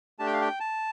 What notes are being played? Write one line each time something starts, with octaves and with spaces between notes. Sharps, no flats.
A3 D4 G4 A5
G5
F5
G5
A5